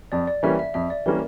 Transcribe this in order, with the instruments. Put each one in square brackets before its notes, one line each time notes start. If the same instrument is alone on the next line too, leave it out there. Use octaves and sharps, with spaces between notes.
[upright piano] F2 [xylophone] D5
[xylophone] D5
[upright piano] E3 G3 A#3 C#4 [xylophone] E5
[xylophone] E5
[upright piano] F2 [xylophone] E5
[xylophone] D5
[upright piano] E3 G3 A#3 C#4 [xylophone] A#4